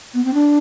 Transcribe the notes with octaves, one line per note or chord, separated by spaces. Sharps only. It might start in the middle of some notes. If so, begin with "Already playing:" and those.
B3
C4
D4